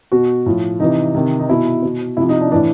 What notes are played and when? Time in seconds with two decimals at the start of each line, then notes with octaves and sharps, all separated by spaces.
0.12 B2 F#4
0.46 A2 F3
0.80 C3 E3 D#4
1.14 C3 D#3
1.39 D#4
1.49 B2 E4
1.83 B2
2.17 C3 F3 E4
2.29 D#4
2.41 D4
2.52 E3 D4
2.55 A2